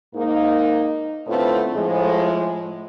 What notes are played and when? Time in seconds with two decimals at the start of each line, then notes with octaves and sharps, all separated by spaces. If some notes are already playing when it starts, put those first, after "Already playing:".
0.15 G#2 A#3 D#4
1.27 A2 D3 A3 B3 C4 F4
1.74 A2 F3 G#3